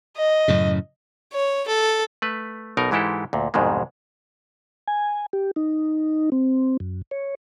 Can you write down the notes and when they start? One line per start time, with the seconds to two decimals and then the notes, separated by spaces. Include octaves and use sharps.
0.17 D#5
0.48 F#2 A2 C#3
1.33 C#5
1.68 A4
2.22 A3 B4
2.77 B1 B2 D#4 A#4
2.91 G#2 E3 G#3 E4 G4 A4
3.33 D2 A#2
3.54 C2 F2 G#2 B2 D#3 G#3
4.88 G#5
5.33 G4
5.56 D#4
6.32 C4
6.80 F#2
7.11 C#5